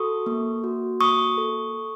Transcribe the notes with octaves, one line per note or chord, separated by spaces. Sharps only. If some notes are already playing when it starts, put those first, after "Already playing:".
Already playing: F#4 A4 C#6 D#6
A#3
F#4
A#3 C#6 D#6
A4